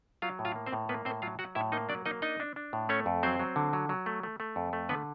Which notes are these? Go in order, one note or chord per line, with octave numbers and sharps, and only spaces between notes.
F#3 F4 F5
A2
F4 F5
A#3
C4 C5
A2
A#3 B3 B4
A2 C4 C5
F#3 F4 F5
F#3 F#4 F#5
A2 E4 E5
A#3 D#4 D#5
F#3 D4 D5
A#3 D#4 D#5
D4 D#4 D#5
D4
D4
A2
A3 C#4 C#5
F2
F#3 C4 C5
F#3
D3
F#3
F#3
A3
A3
A3
F2
A3
D3 B3 B4